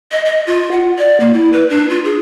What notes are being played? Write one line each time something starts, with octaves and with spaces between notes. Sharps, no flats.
D#5
D#5
F4
F#5
D5
A#3
E4
B4
D4
F4
G#4